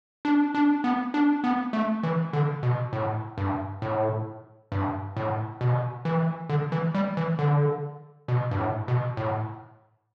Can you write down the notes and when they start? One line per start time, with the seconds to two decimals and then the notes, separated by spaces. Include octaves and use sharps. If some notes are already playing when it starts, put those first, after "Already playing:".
0.25 D4
0.55 D4
0.84 B3
1.14 D4
1.44 B3
1.73 A3
2.03 E3
2.33 D3
2.63 B2
2.93 A2
3.38 G2
3.82 A2
4.72 G2
5.17 A2
5.61 B2
6.05 E3
6.50 D3
6.72 E3
6.95 G3
7.17 E3
7.39 D3
8.28 B2
8.51 G2
8.58 A2
8.88 B2
9.17 A2